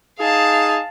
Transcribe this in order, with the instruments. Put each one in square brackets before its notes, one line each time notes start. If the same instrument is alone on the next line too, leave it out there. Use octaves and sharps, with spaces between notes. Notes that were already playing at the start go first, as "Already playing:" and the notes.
[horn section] D#4 G#4 [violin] F5 A5